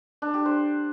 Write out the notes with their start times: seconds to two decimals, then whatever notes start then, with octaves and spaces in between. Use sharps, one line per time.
0.22 D4
0.34 G4
0.46 C5